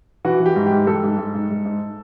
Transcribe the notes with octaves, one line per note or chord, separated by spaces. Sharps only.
E3 F#4
E3
G4
G#2
G#2 G4
G#2 A4
G#2
G#2
G#2
G#2
G#2